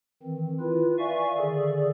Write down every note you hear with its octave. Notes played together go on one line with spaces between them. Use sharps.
D#3 E3 C4
E4 F4 B4
D5 E5 F5 G#5 C#6
D3 D#3 G#4 A4 D5